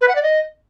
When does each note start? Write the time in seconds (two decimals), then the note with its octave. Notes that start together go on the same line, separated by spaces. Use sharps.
0.01 B4
0.08 F#5
0.16 D5
0.23 D#5